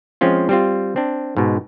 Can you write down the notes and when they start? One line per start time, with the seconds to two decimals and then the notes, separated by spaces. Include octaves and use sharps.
0.21 F3 G#3 C4 C#4 F4
0.49 G3 C4 F4
0.96 C4 D4
1.37 G#2 B2